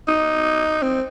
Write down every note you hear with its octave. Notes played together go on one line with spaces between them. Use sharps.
D#4
C4